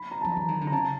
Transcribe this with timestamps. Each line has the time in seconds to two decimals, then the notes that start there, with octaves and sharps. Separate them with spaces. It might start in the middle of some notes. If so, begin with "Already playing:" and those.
Already playing: B5
0.11 A#5
0.21 F3 A5
0.32 E3 A#5
0.48 D#3
0.61 D3
0.67 A#5
0.72 C#3 A5